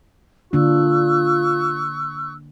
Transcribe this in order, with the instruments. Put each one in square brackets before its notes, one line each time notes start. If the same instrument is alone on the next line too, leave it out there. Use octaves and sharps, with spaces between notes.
[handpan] D3 A#3 D4 [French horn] F4 [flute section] C#6 E6 F#6